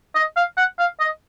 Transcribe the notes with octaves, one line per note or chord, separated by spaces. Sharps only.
D#5
F5
F#5
F5
D#5